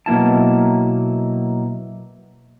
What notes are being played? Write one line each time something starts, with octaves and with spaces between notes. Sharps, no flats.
B2 F#3 A#3 E4 A5